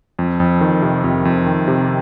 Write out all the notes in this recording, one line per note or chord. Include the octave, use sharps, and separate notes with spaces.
F2
F2
D#3
C3
F2
F2
D#3
C3